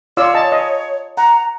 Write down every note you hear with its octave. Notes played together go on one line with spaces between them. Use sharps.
F4 C#5 D5 E6
D#5 A5
D#5
F#5 A#5